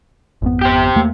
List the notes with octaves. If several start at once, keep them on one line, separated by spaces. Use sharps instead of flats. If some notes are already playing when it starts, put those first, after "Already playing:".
G#1 F2 B3
G4 C5
E2 A3 A#3